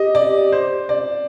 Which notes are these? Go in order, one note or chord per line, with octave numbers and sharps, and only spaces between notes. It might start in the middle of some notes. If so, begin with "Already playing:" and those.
Already playing: G4 D#5
D5
C5
D5